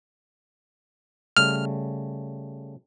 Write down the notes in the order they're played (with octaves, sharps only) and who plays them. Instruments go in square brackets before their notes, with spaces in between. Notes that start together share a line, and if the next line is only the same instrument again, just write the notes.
[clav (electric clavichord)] C#3 G3 A3 [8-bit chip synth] F6